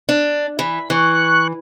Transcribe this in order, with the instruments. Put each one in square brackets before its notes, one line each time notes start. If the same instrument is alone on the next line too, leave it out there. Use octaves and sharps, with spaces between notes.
[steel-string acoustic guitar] D4
[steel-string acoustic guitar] E3 [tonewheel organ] B5
[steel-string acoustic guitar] E3 [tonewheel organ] C#6 F#6